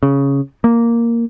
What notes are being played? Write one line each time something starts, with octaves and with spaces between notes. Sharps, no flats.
C#3
A#3